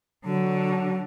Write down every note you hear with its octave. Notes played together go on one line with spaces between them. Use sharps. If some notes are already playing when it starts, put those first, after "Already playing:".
D3 F#3